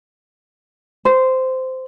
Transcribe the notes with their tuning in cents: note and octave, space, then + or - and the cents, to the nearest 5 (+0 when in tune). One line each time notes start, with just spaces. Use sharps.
C5 -15